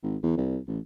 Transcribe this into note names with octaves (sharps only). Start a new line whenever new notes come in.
G#1
E2
C2
A1